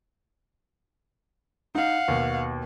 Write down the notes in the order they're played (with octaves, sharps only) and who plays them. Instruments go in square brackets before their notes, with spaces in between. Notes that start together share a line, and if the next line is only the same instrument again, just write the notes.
[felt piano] D#4 [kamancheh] F5 F#5
[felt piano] D#2 B2